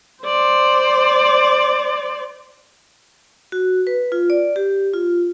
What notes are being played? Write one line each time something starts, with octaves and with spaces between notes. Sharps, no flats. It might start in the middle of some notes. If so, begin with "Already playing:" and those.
C5 D5
F#4
B4
F4
D5
G4
F4